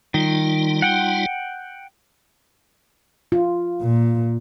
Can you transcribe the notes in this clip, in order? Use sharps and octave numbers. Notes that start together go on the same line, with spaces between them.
D#3 G3 D#4 F4
F#5 G5
F4
A#2